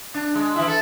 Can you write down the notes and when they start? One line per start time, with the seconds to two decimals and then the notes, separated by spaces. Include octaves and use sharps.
0.14 D4
0.35 G#3
0.56 E3 E4
0.68 A4